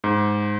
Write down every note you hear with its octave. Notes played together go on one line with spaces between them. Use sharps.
G#2